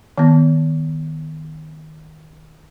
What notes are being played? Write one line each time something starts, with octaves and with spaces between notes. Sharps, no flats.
D#3 B3